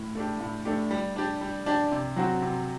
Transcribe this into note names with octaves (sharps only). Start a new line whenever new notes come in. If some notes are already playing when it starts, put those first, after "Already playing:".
Already playing: A2
A3 D4 G4
A2
A3 D4 G4
G3
D4 G4
G3
D4 G4
C3
F#3 C4 F#4
C3